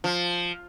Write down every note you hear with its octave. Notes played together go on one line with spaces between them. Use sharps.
F3